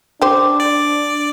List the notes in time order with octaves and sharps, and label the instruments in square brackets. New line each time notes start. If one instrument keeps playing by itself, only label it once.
[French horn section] D4 [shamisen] G4 C5 [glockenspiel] D6
[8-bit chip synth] D5